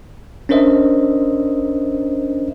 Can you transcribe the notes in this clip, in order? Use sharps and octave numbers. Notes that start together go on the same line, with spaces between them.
C#4 D4 A#4 C5 D#5 E5